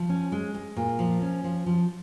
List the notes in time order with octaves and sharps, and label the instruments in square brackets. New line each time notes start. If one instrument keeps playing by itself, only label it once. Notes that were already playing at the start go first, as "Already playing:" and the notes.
Already playing: [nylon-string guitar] F3
C#4
G#3
G#3
A#2
F3
C#4
F3
F3